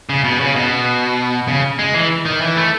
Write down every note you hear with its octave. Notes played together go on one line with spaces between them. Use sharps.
C#3
B2
C#3
B2
C#3
G#3
E3
D#3
E3
A3